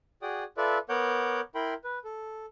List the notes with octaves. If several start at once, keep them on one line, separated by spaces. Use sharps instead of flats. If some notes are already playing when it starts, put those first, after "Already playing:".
F#4 G#4 D5 G5 D#6
F4 A4 B4 D5 E5
B3 A#4 C#5 F#5 D6 G6
E4 A#4 G5 B5 C6
B4
A4